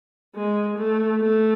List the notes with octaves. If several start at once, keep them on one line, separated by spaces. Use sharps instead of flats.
G#3
A3
A3